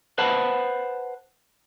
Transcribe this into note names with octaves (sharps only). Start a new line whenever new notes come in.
B4 C5 F#5 A5 B5